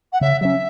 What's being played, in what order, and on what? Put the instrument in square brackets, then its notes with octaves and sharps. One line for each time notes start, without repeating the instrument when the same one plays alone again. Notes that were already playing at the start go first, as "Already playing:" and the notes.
[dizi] F#5
[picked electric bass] C#3 [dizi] E5
[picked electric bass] F#3 C#4 [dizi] E5